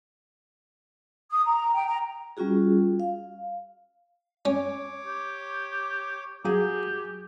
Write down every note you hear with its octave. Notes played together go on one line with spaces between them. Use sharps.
D#6
A#5
G5
A#5
G3 C#4 F4 F#4 G#4
F5
C#4 C#5 D6
G4
F#3 G4 G#4